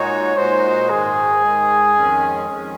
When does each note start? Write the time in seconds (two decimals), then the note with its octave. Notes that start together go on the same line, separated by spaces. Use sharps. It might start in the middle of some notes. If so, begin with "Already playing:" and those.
Already playing: A#2 G#3 D#4 F#4 C#5
0.37 A#2 G#3 D#4 F#4 C5
0.90 G#2 D#3 G#3 G#4
1.43 G#2 D#3 G#3
1.96 F2 D#3 G#3 C#4
2.48 F2 D#3 G#3 C#4